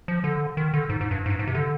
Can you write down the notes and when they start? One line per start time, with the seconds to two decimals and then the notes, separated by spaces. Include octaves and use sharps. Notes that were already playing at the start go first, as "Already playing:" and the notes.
0.08 F3
0.24 D3
0.57 D#3
0.73 D3
0.89 G#2
1.01 G#2
1.11 G2
1.26 G#2
1.30 G2
1.39 G#2
1.47 C3
1.55 D3